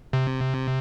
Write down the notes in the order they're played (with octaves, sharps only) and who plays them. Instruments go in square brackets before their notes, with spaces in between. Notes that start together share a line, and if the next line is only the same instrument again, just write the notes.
[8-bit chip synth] C3